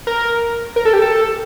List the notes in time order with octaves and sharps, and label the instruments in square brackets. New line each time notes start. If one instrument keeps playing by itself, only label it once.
[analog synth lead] A#4
A#4
A4
G4
A4